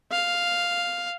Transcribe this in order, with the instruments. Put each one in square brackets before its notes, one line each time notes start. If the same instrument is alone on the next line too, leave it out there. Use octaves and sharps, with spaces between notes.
[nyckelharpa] F5